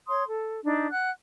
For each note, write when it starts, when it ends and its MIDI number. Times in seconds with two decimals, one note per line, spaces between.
0.07 0.23 73
0.07 0.23 84
0.07 0.23 87
0.27 0.61 69
0.64 0.87 62
0.64 0.87 63
0.91 1.09 78
0.91 1.09 90